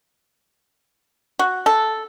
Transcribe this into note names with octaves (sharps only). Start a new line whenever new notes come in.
F#4
A4